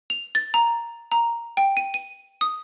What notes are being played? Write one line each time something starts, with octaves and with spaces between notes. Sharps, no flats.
F7
A6
A#5
A#5
G5
D#7
D#7
D#6